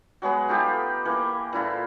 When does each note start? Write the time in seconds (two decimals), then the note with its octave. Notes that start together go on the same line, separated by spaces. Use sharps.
0.22 F#3 G#3 B3 G#4
0.48 A3 D#4 F4 G4
1.05 E3 A#3
1.53 A#2 E4 F4 A4